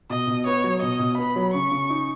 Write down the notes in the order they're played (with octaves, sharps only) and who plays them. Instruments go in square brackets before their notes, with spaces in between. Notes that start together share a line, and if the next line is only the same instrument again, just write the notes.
[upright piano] B2 [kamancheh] D#5
[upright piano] B2
[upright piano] B3 [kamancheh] C#5
[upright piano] F#3
[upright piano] B2 [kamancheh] D#5
[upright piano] B2
[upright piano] B3 [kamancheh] B5
[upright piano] F#3
[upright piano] C#3 [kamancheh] C#6
[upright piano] C#3
D#4